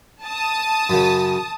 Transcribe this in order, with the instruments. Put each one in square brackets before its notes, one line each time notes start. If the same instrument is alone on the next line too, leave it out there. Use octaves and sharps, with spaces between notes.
[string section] A5 D#6
[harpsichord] F#2 C#3